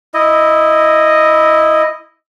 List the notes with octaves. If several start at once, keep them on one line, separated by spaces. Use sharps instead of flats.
E4 D#5